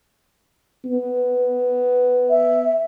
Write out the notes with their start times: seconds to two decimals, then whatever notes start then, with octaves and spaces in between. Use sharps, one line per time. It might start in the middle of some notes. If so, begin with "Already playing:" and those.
0.85 B3
2.30 E5